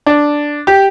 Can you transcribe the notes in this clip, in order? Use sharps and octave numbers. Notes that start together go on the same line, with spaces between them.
D4
G4